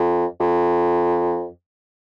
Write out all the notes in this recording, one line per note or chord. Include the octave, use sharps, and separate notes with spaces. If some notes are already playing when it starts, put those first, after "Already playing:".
Already playing: F2
F2